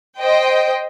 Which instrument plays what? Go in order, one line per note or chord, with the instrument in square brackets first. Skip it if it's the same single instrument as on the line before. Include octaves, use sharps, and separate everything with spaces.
[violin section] C5 D#5 G5